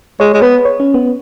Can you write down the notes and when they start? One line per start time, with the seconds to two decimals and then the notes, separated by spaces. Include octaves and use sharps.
0.20 G#3 C#5
0.34 G#3
0.42 B3 B4
0.65 C#5
0.80 C#4
0.94 B3